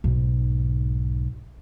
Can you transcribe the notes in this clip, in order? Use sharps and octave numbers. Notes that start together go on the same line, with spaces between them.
B1 G#2